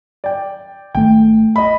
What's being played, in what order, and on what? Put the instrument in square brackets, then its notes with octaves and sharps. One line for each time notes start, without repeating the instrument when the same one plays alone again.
[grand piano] D5 G5
[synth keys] G#1 A3 [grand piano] G5
[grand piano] D#5 B5